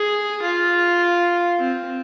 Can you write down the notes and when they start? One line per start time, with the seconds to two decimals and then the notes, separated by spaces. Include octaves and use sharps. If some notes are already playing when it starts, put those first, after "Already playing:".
Already playing: G#4
0.42 F4
1.59 C4